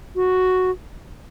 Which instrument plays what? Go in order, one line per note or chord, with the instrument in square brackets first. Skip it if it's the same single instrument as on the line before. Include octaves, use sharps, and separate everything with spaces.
[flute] F#4